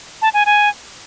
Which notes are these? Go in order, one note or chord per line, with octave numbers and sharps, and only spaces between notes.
A5
G#5
G#5